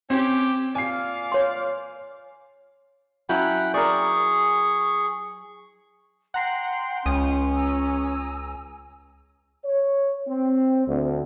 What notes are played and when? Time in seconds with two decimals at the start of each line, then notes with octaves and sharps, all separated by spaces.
0.10 C4 C#4 G4
0.75 A#2 D5 F5 G#5 C7
1.32 C#5 C6
3.29 F#3 C#4 E4 F#5 G5 B5
3.74 G#4 A#4 D5 C#6
6.34 F#5 G5 A#5 C6 C7
7.06 C#2 C#4 D#6
7.56 G#5 A#5 E6
9.65 C#5
10.28 C4
10.87 D2